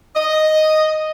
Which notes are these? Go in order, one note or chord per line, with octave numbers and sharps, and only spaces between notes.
D#5